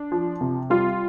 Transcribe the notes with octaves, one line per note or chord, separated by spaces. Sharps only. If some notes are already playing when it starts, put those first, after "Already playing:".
Already playing: D4
F3
C3
G3 F4